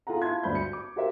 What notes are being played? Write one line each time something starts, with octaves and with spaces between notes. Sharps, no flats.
F4 G#4 A4 F#5 A#5
E4 F4 A5 C6 G#6
D2 G2 C5 D5 B5 G6
C#7
D6
F#4 G4 A#4 C5 E5